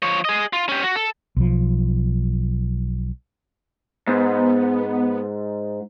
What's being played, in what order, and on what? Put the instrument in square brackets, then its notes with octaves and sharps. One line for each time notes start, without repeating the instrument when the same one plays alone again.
[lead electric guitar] F3 C#5
G#4 D#5
F4
C#4 G4
F#4
A4
[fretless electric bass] B1 F3
[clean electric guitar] G#2 [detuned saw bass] B3